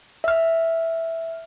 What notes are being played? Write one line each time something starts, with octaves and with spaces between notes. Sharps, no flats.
E5 F6